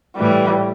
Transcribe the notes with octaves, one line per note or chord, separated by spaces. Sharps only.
A2 E3 G3